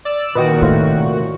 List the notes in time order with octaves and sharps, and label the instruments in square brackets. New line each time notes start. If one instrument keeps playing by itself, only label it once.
[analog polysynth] D5 E6
[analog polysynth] A#2 F#4 [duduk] D#3 [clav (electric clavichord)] B4 D#5 G5
[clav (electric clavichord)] A2 C5 F5 [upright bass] C3